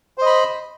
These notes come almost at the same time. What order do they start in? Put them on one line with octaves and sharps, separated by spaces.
C5 D#5 B5